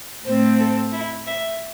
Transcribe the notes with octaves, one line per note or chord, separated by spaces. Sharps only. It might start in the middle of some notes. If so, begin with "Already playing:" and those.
A2 A3 C4 C5
A4
E4
E5